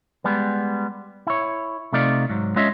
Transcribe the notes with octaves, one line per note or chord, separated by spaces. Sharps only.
G3 G#3 B3
E4 C#5
C3 A3 D#4 F4 D5
G#2 F#3
G#3 C#4 F4 C#5 D#5 E5